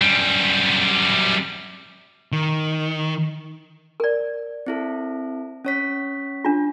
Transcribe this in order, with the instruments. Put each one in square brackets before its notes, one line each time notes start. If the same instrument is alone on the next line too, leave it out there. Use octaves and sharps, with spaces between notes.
[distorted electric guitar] F#2 G3
[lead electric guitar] D#3
[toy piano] A#4 D5
[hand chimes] C4 E4 A4
C#4 C#5 B6
[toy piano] D4 F4